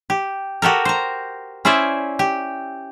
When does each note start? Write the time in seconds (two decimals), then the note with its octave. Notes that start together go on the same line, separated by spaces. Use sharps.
0.10 G4
0.62 F#4 G4 A4 A#4
0.85 C5 A#5
1.65 C#4 E4 C5 D5 E5
2.19 G4